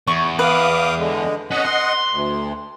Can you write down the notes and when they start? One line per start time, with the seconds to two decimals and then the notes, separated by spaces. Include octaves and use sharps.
0.07 E2 C#6
0.39 B4 F5 D6 D#6
0.98 D3 G#3
1.51 C#4 D#5 F#5
1.65 C6
2.11 D2